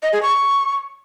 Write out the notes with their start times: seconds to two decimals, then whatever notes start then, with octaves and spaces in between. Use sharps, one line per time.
0.03 D#5
0.13 G#4
0.23 C#6